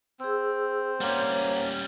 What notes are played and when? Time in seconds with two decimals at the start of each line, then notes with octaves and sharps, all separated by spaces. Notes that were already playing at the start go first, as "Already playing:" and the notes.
0.20 C4 G#4 E6
1.01 G3 A#3 C#4 C5 C#5 F#5